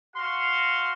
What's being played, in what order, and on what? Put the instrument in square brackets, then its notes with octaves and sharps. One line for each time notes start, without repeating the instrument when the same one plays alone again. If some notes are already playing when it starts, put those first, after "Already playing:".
[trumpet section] F#4 F5 C6